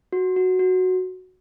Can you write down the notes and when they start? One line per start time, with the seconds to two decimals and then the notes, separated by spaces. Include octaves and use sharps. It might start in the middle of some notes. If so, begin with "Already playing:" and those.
0.12 F#4
0.36 F#4
0.59 F#4